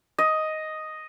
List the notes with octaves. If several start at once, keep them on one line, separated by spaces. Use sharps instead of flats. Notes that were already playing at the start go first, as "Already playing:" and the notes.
D#5